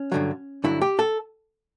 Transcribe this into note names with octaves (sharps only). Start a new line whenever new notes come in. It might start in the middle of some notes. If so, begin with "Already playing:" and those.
Already playing: C#4
G2 D3 F#3
G2 D3 F#3 E4
G4
A4